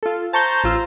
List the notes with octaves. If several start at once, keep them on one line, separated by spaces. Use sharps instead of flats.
F4 A4
C5 A5 A#5 C#6 G6
A1 F4 E6